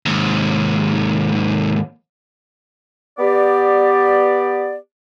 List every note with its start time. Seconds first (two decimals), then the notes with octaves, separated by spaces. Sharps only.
0.06 D#2 G#2
3.19 B3 G4 D5